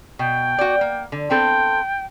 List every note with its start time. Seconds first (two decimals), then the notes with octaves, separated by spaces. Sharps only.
0.19 B2 G5
0.59 F#4 D5
0.81 A#3
1.12 D3
1.30 B3 C4 A4 G5